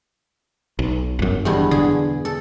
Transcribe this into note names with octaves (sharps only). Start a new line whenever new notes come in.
B1
G1 F#2
E2 G2 B2
D3 G#4
A4